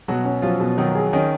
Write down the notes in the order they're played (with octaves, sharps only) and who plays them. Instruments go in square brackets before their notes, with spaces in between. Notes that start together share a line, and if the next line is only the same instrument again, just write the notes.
[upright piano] B2 [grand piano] F#3 F#4
[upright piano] C#4
[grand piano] F3 F4 [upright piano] F#3
[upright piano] B2
[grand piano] D#3 D#4 [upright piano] F#3
[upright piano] G#4
[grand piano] D#3 D#4 [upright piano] C#4